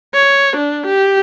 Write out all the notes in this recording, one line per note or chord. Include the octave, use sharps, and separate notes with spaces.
C#5
D4
G4